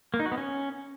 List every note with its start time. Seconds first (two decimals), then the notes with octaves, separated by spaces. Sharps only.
0.14 A#3
0.20 D#4
0.26 F#4
0.32 B3
0.38 C#4